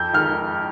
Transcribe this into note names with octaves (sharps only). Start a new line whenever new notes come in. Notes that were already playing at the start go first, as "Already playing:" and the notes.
Already playing: F2 G6
D#3 G#3 F6